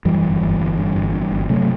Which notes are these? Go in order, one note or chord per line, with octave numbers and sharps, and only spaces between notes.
F#2 E3 G3
G1
G1
G1
G2
G1
G2
G1
C3 F#3 A3